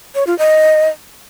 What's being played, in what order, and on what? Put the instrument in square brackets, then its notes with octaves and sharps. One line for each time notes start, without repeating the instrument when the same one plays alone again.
[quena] C#5
F4
D#5